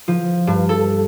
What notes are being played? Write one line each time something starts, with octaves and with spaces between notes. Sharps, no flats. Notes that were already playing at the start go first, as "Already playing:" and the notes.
F3
G2
A4